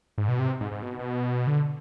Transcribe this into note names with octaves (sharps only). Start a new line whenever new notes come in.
G#2
B2
C3
G#2
G#2
B2
B2
D3